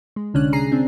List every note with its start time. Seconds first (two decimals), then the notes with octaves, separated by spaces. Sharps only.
0.16 G#3
0.34 C2 D3 C#4 D4 F#6
0.52 C2 G#4 A#5 C7
0.72 C4 D4